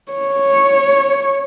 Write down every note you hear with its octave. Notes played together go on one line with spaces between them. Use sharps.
C#5